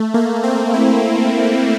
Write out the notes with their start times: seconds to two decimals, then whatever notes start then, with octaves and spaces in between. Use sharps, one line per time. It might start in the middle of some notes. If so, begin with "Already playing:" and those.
Already playing: A3
0.14 A#3
0.43 C4
0.74 E4